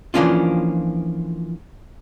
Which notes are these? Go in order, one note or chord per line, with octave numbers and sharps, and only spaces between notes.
E3 F3 A#3 C#4 D4 F4